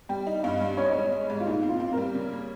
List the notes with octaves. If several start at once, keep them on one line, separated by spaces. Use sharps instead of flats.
G3 G5
D#4
G2 F5
G3
C#4 C#5
D#5
G#3 C#5
G#3
G#2
F4
A#2 D#4
C4
F4
C4
G3 A#4
C#3
A#3